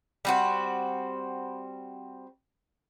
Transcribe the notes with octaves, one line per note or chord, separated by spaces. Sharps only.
G3 C4 F#4